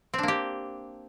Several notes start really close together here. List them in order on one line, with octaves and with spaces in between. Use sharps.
C4 D4 A#3 G4